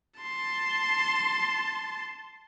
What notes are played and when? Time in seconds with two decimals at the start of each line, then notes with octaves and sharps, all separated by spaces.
0.20 A5 C6